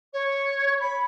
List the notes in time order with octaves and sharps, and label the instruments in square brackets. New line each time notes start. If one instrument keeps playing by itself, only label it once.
[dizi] C#5
B5